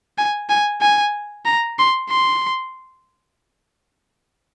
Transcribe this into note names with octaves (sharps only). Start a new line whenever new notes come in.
G#5
G#5
G#5
A#5
C6
C6